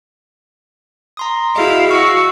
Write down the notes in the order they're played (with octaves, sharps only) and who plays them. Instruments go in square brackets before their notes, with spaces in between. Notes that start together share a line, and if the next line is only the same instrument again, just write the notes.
[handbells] A#5 C6 D#6
[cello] E4 F5 [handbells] F#4 G#4 D#5
[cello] F#4 [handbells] C#6 E6